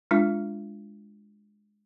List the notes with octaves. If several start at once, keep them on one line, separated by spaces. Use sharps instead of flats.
G#3 D4 F4